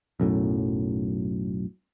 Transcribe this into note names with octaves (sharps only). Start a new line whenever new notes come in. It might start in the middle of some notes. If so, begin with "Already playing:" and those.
B1 F#2 A2